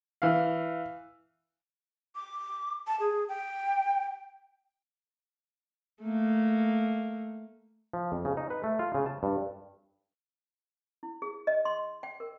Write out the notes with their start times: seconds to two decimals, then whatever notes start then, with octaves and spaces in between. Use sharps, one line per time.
0.22 E3 F5
2.15 D6
2.87 A5
3.00 G#4
3.29 G5
6.03 A3 A#3
7.93 F3
8.12 F2
8.25 C#3
8.37 D#4
8.50 B4
8.64 A3
8.79 F4
8.94 C#3
9.06 A5
9.23 G2
11.03 E4
11.22 G#4
11.47 D#5
11.65 C6
12.03 G5
12.20 A#4